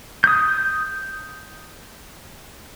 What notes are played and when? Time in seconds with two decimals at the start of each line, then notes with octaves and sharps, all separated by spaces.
0.24 D#6 G6